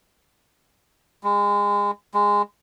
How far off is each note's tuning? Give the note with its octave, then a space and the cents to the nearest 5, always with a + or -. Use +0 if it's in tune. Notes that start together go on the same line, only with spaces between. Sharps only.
G#3 -30
G#3 -15